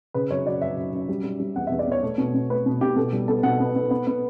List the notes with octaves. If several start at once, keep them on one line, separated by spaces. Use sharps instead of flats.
C#3 B4
F#2 C#5
F#3 D5
F#2 E5
F#2
F#2
G3
G3
G3
E2 F#5
E2 E5
D5
B3 C#5
A3
B2
B2
A3 B4
B2
B2 G4
B2 A4
G3
B3 A4
B2 F#5
B3
B3
B3
B3